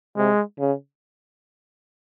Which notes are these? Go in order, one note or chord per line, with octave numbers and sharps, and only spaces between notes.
C3 G#3
C#3